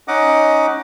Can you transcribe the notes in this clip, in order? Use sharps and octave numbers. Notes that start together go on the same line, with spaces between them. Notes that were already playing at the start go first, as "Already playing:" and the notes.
C#4 D#4 D#5 F#5 D6